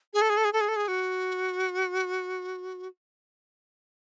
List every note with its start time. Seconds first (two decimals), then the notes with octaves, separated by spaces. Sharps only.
0.14 G#4
0.22 A4
0.30 G#4
0.37 A4
0.45 G#4
0.53 A4
0.61 G#4
0.68 A4
0.76 G#4
0.88 F#4